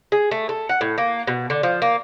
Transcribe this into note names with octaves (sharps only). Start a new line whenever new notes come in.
G#4
A3
A4
F#5
A2
A#3
B2
D3
F3
A#3